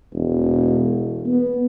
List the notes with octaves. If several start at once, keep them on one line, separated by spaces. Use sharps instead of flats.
E1
B3